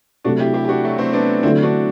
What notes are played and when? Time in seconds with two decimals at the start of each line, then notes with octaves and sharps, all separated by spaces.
0.24 C3 F#3 A3 D4 F#4
0.39 E4 G4
0.54 E4 G4
0.65 G4
0.69 D4 F#4
0.84 F#3 A3
0.98 A3 C4
1.13 B3 D4
1.43 D3 F#3 A3 C4 E4
1.63 D4 F#4